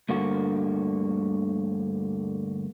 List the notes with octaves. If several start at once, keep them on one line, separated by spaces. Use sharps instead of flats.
D2 G2 D3 A#3 F#4